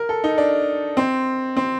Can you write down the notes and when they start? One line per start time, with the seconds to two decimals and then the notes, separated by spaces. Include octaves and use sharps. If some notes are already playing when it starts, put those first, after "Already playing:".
Already playing: A#4
0.09 A4
0.24 D#4
0.38 D4
0.97 C4
1.57 C4